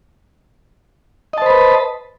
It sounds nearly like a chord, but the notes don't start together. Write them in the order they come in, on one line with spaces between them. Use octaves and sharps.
D#5 A5 C5 B5 B4